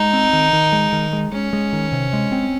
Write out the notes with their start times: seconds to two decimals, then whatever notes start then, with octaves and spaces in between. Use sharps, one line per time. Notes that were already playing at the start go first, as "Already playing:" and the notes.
Already playing: G#3 D#4
0.13 C4
0.33 D#3
0.53 D#3
0.72 G#3
0.93 D#3
1.13 G#3
1.32 G#3 C#4
1.53 G#3
1.73 D#3
1.92 C3
2.13 G#3
2.32 C4